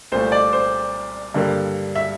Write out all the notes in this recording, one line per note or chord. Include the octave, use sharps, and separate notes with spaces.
C2 A#2 A3 C5
D5
C5
G2 D3 G3 A#3
E5